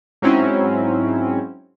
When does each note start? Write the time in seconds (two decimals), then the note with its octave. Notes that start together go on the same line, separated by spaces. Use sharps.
0.22 G#2 F#3 C4 C#4 E4